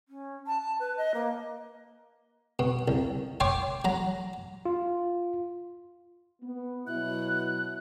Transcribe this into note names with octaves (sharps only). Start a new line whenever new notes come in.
C#4
A5
A5
B4
D#5
A#3
B2
C2
C#5 G5 C6 D6
F#3 A#5
F4
B3
B2 F#3 E4 F#6